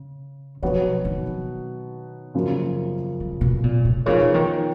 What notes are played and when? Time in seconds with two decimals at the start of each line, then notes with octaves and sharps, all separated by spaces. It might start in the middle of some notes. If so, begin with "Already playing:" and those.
Already playing: C#3
0.62 B2 F3 F#3 B3 F#4 C#5
1.05 D#3
2.34 F#2 C#3 F3 A#3 F4
3.20 C#3
3.41 B2
3.64 A#2
3.85 B2
4.06 C#3 F3 B3 D#4 A#4 C#5
4.34 D#3